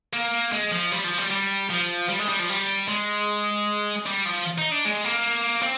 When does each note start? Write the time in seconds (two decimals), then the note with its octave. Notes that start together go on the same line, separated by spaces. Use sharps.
0.13 A#3
0.52 G#3
0.71 F3
0.92 G3
1.04 F3
1.18 G3
1.31 G3
1.70 F3
2.09 G3
2.19 G#3
2.29 G3
2.39 F3
2.49 G3
2.88 G#3
4.06 G3
4.25 F3
4.58 D#4
4.71 D4
4.85 G#3
5.04 A#3
5.63 C4